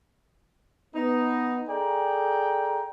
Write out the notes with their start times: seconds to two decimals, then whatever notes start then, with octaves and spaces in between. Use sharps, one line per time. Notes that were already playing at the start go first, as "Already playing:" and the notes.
0.95 B3 D#4
1.68 G#4 A4 D5 G5 A#5